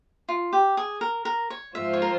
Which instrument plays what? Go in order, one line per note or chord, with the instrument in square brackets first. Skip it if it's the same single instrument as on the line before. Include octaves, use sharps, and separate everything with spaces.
[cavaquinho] F4
G4
G#4
A#4
A#4
C#5
[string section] G#2 F3 C4 F4 C5 [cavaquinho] E5
[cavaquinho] C#5
A#4